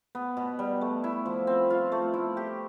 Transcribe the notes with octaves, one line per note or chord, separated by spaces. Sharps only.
B3
B2
G3
A3
E4
F3
C4
F4
A3
E4
G4